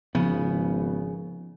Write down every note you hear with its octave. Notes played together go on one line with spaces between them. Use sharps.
G#1 C#3 F3 B3